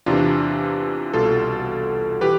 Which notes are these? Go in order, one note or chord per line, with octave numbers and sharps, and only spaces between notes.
E2 C3 E3 D4 F4
C2 B2 F4 A4
E3 G4 B4